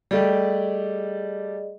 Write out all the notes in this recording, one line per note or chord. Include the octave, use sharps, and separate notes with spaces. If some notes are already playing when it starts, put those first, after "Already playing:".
G3 A3 G4 G#4 D5 D#5